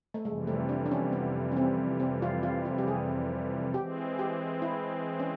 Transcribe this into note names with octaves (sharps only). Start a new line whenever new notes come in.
A3
F2 C3 E3 G3 G#3
A3
D4
D4
C#4
B3
C#4
C4
C4
F4
F4
F4
G4
G#4
E3 G#3 C4 G4
G4
E4
C#4